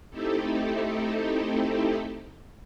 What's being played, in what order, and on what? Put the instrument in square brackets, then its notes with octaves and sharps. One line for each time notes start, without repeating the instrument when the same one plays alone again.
[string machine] A3 C4 D#4 E4 G4 A4